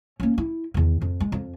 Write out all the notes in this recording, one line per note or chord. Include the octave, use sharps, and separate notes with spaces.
A#3 C#4
E4
E2 D#3
F2
G#3
F2